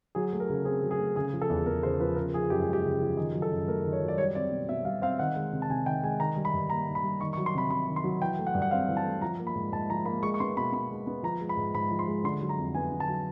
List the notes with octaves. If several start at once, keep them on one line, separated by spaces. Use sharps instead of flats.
F#3 G#4
A3
A#4
C#3
C4 G#4
F#3
G#4
A3
C#3 G#4
F3
A4
E2
E2 A#4
C#3 C5
F3 B4
C#3 A#4
F3 G#4
F#2 G4
G#4
G#3
G4
C#3
F3
D#3 G#4
F#3
A4
F#2
A3 A#4
D#3
C#5
F#3
D5
G3 C#5
C4 D5
B2
B2 E5
G3 F5
C4 F5
D#3 F#5
G#3
C3
A5
C3 G#5
D#3 G5
G#3 G#5
D#3 A#5
G3
B5
G2
A#3 A#5
D#3
B5
G3
D#3 C#6
C#6
F#3
C6
C3 B5
C3 B5
D#3
C6
F#3
E3 G5
A3
F#5
G2
F#5
C4 F5
E3
A5
A3
F3 A#5
A#3
B5
G#2
G#2 A5
F3 A#5
A#3 B5
G#3 C#6
C#6
B3 C6
B2 B5
B2 B5
G#3
B3
F3 A#5
G#3
B5
G#2
G#2 B5
F3
C6
G#3
D3 C6
F#3
A#5
F2
B3 G#5
D3
A5
F#3